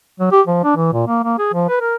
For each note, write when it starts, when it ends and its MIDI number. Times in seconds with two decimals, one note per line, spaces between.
0.20 0.31 54
0.32 0.41 67
0.47 0.60 53
0.64 0.73 62
0.76 0.91 52
0.93 1.04 46
1.07 1.20 58
1.24 1.38 58
1.39 1.48 68
1.53 1.68 53
1.69 1.79 71
1.81 1.96 70